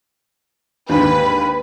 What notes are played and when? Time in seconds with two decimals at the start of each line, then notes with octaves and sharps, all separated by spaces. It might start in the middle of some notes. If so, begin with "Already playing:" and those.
0.89 D#2 G#2 D3 B4